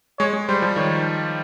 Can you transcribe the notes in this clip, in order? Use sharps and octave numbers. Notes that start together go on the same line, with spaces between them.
G#3 C#5
G#3
G3 C5
F3
D#3 C#5